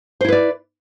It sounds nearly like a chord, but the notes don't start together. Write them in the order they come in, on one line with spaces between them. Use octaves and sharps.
C5 E4 B4 D5